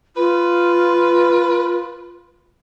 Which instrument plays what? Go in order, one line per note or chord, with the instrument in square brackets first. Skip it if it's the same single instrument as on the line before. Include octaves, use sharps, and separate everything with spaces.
[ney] F4 [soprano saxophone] B4